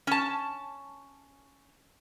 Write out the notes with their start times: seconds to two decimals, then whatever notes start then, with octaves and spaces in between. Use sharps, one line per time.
0.07 C#4 A5